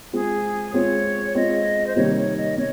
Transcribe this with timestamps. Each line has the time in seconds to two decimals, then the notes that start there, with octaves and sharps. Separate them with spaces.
0.13 G#3 C4 F4 G#4
0.73 G#3 C4 F4 C#5
1.35 G#3 C4 F4 D#5
1.86 C5
1.96 C3 D#3 G3 A#3 C#5
2.16 C#5
2.36 D#5
2.57 C3 C#5